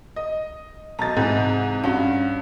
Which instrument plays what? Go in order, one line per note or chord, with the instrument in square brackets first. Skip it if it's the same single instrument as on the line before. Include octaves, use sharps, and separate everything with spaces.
[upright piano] D#5
[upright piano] B1 A6 [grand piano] D#5 A#5 [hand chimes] A5
[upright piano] G#2 C3 E3 [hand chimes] C4 [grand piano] D#5
[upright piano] G2 [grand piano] C#4 F#4 [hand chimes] F5